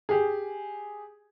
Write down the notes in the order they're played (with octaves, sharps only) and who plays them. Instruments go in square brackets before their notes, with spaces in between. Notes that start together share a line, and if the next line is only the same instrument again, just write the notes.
[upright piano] G4 G#4